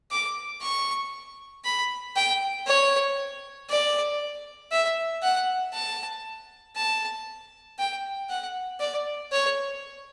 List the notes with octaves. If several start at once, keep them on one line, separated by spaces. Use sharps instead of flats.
D6
C#6
B5
G5
C#5
D5
E5
F#5
A5
A5
G5
F#5
D5
C#5